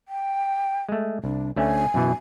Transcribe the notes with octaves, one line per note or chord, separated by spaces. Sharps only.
G5
G#3 A3
C2 D4
D2 A3 C#4 G#5
F#2 B2 E3